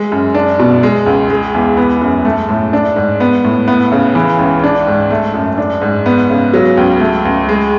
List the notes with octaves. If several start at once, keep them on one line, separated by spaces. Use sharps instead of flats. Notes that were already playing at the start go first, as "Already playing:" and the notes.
Already playing: G#3
F#2
D4
B2
G#3
C#2
G#3
E2
B3
F#2
A3
A2
D4
G#2
B3
A2
B3
C#3
E3
C#2
D4
G#2
A3
F#2
D4
G#2
B3
C#3
F#3
C#2
A3
C#2
G#3